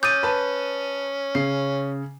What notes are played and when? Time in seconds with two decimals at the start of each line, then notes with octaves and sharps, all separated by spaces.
0.03 C#4 D6 D#6 G6 A6 D#7
0.23 B4 A5
1.35 C#3 C7